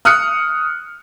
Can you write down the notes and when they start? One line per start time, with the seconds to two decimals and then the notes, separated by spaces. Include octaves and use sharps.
0.05 D#6 F6 F#6 C#7